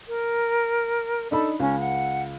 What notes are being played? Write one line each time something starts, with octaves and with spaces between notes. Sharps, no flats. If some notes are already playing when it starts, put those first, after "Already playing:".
A#4
D4 D#4 A4 B5
C#2 C#4
F#5